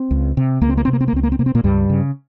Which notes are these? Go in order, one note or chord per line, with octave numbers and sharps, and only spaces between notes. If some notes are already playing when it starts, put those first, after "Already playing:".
Already playing: C4
C#2
C3
C#2 A#3
C4
A#3
C3 C4
A#3
C4
A#3
C#2 C4
A#3
C4
C3 A#3
C4
A#2 A#3
C#2 G2 G3
C#3